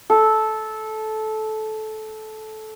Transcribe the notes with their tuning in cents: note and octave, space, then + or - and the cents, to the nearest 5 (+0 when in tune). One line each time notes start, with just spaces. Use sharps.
A4 -15